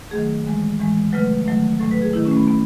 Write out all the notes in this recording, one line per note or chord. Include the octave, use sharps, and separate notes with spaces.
D#3 F#3 A3 G#4
A2 E3 G#3
A2 E3 G#3
C#3 F#3 A3 B4
D#3 F#3 A3
A2 F#3 A3 A4
B4
G#4
D#3 A3 E4
C#4
A3
B3
A3 B3